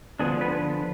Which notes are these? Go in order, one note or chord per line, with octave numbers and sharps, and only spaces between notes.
D3 F3 B3 D4 G#4
B3 B4